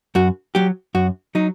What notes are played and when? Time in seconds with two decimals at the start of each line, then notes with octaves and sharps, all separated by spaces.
0.15 F#2 F#4
0.55 F#3 G4
0.95 F#2 F#4
1.35 F#3 D#4